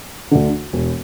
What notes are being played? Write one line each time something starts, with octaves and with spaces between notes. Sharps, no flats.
D2 D3
E1